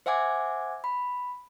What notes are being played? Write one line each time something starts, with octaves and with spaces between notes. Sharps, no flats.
C5 E5 F#5 G#5 D6 G#6
B5